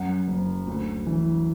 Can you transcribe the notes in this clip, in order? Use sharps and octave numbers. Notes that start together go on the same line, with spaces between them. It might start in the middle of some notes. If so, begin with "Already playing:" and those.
Already playing: F#2 F#5
F#1
D2
E3